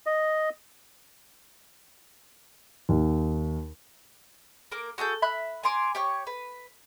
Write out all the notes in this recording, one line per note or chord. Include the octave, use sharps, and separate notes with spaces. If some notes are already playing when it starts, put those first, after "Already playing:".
D#5
D#2
A#3 A#4 D6
F#4 G#4 A4 G6
E5 B5 F#6
G#5 A#5 C6 D6
G4 C#5 C#6
B4